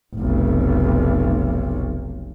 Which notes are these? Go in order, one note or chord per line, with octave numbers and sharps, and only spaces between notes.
F1 B1